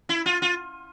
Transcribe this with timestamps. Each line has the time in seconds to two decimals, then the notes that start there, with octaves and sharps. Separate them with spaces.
0.09 E4
0.26 F4
0.42 F4